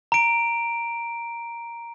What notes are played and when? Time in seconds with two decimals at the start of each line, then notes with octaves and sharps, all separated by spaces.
0.12 A#5 D7